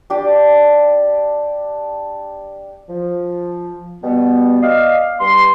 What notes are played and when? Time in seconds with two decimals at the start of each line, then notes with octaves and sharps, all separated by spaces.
0.10 D4 G4 D6
2.89 F3
4.03 B2 G3 B3
4.63 D5 D#5 F5
5.20 G2 C6